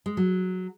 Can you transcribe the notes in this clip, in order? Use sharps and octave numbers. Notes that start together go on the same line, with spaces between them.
G#3
F#3